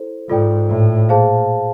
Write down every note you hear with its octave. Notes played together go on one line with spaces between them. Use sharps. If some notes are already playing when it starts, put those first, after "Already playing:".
Already playing: E4 A4 C5
G#2 F4 A4 D5 G5
A2
A#2 G#4 C5 F5 A5